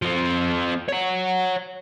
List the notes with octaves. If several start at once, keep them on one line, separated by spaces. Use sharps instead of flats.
F3 C4
C#5 F#5